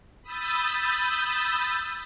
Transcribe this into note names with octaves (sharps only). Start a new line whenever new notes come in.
B5 D#6 E6 G6 A6